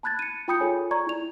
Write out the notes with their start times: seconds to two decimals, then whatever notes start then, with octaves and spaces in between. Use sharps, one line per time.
0.03 A5 B5 F#6 G#6 A6
0.19 C#7 D#7
0.48 F4 G5 B5 D#6 G6 C#7
0.60 F4 G#4 A4 C#5 G#5
0.91 D5 A#5 C#6 G#6
1.07 E4 F7